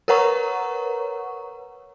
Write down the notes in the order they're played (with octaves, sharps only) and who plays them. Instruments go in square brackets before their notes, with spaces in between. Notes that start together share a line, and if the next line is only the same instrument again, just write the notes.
[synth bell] A#4 B4 C#5 F#5 A#5 C#6